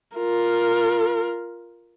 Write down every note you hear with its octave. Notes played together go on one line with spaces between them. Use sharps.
F4 A#4